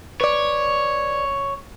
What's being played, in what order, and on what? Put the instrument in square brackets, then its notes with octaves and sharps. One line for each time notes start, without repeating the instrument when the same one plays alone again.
[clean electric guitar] B4 D5 [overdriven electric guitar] C#5